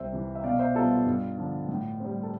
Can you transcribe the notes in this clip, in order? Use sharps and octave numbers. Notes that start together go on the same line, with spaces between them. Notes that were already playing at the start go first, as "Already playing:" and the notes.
Already playing: C2 C5 E5
C3 E3
E5
B2 D5 F5
C5 E5
G3 B3 F4 A4
F4
G2
D3 F3
A2
G3 C4
A4